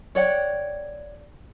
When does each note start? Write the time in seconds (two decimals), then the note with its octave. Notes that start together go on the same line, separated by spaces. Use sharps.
0.15 C#5 D5 F#5 G5